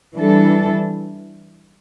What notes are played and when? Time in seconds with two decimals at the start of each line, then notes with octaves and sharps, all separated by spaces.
0.17 E3 G3 D4 A4